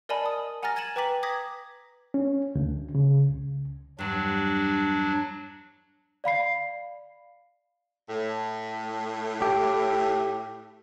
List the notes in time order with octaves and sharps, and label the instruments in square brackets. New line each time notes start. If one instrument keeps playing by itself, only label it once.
[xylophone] A#4 D5 D#5 G#5 A5 B5
D#6
F#5 G#5 A#5 F6 A6 A#6
G#6 A6 D#7 E7 F#7
B4 G5 A#5 D6 B6 F#7
D6 D#6 G#6 A#6 B6
[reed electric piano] C#4
D2
C#3
C#2
[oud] E2 G2 [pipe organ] F#3 D4
[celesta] D5 F5 B5 C7
[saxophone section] A2
[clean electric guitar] G4